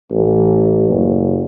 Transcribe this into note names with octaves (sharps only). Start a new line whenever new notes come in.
A1
F#1